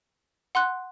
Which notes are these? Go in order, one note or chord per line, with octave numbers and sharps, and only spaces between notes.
F#5 C6 F#6